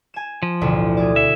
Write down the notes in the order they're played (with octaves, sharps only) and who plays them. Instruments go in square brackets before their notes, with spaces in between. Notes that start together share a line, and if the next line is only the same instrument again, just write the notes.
[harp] G#5 E7
[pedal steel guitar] F3
[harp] A1 D2 B2
G#4 D5
[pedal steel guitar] E5 [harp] C#7